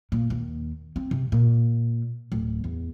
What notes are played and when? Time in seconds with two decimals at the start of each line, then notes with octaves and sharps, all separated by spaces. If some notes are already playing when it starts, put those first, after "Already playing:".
0.12 A#2
0.30 D#2
0.96 C4
1.11 C3
1.32 A#2
2.32 D1
2.64 E2